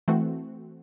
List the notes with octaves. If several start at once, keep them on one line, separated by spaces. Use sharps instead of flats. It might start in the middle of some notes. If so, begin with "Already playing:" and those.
E3 A3 C4 F#4